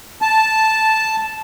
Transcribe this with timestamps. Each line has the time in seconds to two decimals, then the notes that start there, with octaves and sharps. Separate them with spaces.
0.22 A5